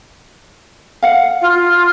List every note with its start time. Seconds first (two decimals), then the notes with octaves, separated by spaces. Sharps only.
1.02 F5 F#5
1.41 F4